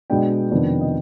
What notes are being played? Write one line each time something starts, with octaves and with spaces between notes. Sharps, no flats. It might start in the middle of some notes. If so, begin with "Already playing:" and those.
B2 G#3 B3 D4 G5
F2 C3 D#3 B3 D4
D#5